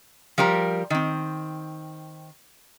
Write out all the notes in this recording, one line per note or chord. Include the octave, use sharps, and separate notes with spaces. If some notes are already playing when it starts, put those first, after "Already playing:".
F3 G3 G4 A#4
D#3 C4